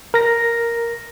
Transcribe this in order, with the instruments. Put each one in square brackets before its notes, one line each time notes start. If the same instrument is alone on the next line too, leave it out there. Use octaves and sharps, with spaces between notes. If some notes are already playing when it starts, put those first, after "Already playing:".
[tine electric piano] A#4 A#6